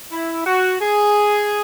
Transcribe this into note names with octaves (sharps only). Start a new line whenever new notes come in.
E4
F#4
G#4